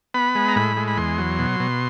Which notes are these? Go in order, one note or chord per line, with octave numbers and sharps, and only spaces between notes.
B3 B5
G#3
A#5
A2 B5
G#3
B5
E2 C6
F#3
B2
B2